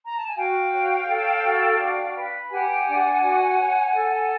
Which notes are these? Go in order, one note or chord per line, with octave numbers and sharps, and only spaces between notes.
A#5
A5
G#5
F#4 F5 G5
C#5
A4
F#4
D4
B4
G4 F#5 G#5
D4
F#4
C#5
A4